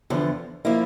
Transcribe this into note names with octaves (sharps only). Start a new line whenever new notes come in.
E2 D3 F3
F3 A#3 E4